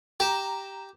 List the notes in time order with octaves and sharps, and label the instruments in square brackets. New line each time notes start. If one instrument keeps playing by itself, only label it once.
[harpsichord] G4 [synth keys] A#5 E7